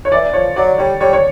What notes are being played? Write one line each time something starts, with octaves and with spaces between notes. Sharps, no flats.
C#5
E3 D5
F3 C#5
F#3 D5
G3 C#5
G3 C#5
C#5